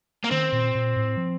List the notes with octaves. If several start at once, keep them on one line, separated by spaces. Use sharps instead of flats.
A#3
D#3 C4
A#2
A#2
A2
F3